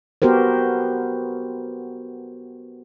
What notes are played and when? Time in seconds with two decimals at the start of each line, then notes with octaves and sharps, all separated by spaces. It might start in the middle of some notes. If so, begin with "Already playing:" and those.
0.22 B3 F#4 G4 A#4 C5